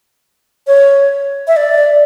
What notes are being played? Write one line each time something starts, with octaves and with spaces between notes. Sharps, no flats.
C#5
E5
D5